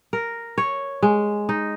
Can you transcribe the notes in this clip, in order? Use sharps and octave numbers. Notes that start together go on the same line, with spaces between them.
A#4
C#5
G#3
D#4